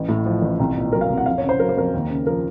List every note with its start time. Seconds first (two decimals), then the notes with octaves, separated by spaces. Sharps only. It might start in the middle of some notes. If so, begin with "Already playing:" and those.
Already playing: A1
0.08 A2
0.26 F3
0.42 A1
0.59 C2
0.76 A#2
0.92 F#3 A#4
1.01 F5
1.10 C2
1.18 F#5
1.26 F2 F5
1.38 C#5
1.44 C#3
1.49 C5
1.60 F#3 A#4
1.69 C5
1.77 F2 A#4
1.94 D#2
2.10 C#3
2.27 F3 A#4